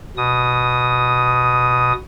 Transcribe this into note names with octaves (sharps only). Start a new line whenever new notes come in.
B2 D#6